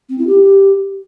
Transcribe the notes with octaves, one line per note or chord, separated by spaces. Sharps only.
C4
E4
G4